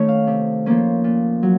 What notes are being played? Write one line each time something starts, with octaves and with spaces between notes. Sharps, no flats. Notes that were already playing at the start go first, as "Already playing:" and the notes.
Already playing: D#3 A3 C#4 C#5
F5
C3
F3 A#3 C#4
A#2
F#3